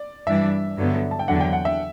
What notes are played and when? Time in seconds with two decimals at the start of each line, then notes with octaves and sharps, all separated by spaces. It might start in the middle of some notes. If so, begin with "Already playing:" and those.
Already playing: D5
0.27 G2 E3 G3 D4 E5
0.77 G2 D3 F#3 B3
1.11 A5
1.19 G5
1.27 E2 D3 F#3 F#5
1.40 G5
1.53 F#5
1.65 E5